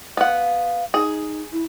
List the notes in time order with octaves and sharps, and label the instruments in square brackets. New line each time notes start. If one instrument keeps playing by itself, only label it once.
[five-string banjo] B3 F#5 [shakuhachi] F5
[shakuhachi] D#4 [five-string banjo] G#4
[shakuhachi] E4